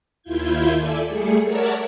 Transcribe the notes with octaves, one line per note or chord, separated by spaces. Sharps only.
D#2 E4 F4 G6 G#6
A4 D5 E5 G#5
G3 A3 G#4 C#7
A#4 C#5 D5 E5 F#5 A5